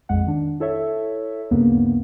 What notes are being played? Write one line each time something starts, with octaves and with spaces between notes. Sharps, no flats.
A#1 F2 G#3 F#5
D#3 D4
E4 A4 C#5 E5
D2 G2 C#3 A#3 B3